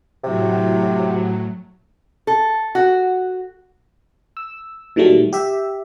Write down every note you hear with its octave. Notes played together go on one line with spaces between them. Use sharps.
A2 C3 F#3
A4
F#4
E6
A#2 D#3 F#3 G3 A3
G4 E5